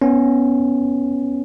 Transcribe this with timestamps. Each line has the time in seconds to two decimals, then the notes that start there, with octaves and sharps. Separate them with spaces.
0.02 B3 C#4